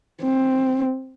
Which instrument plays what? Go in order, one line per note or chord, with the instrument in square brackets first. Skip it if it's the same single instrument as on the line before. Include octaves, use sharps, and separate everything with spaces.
[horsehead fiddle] C4